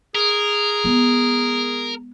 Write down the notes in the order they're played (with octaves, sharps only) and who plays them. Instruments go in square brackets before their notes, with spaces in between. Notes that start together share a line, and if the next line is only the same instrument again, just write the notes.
[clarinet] G#4 [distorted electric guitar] A#4
[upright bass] G#3 B3